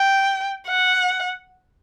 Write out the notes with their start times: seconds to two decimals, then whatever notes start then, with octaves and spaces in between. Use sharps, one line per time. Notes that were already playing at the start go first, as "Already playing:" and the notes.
Already playing: G5
0.68 F#5